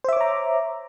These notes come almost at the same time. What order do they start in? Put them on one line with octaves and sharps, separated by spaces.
C5 E5 D6 C#5 A#5